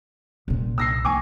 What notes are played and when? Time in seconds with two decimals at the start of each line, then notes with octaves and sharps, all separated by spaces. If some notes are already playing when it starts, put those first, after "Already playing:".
0.48 C2 A#2
0.78 E6 A#6 C7
1.05 F3 G#5 C#6 D6